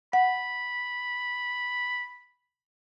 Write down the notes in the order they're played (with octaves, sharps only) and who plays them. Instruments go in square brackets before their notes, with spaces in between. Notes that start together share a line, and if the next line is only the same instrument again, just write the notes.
[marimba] F#5 [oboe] B5